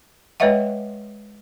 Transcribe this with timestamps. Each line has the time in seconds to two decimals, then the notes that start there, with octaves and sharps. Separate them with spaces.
0.40 G#3 B4 C#5 D#5 E5 F#5